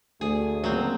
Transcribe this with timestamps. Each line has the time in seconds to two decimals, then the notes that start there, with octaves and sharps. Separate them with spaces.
0.21 D2 A3 G#4
0.64 C#3 F3 F#3 A#3 C4